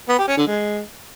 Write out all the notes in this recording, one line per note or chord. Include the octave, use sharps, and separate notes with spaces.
B3
G4
C#4
D3
G#3